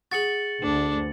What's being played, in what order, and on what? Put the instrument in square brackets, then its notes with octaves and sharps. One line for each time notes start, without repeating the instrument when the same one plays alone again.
[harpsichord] F#4 G#4 [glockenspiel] A6 C#7 F#7
[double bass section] D2 [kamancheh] D4